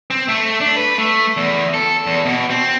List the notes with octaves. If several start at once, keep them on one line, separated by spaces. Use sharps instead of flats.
C4
A3
D4
B4
A3
E2
A4
E2
B2
C4